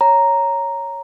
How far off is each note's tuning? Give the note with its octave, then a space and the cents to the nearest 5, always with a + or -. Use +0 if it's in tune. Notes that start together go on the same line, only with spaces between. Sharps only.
C#5 +0 A#5 +0